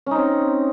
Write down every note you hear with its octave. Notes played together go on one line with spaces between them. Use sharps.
C4 C#4 D#4